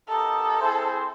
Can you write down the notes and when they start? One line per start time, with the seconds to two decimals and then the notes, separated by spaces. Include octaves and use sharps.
0.08 B3 D#4 G4 A4 A#4 D#5
0.57 C4 E4 G#4 C5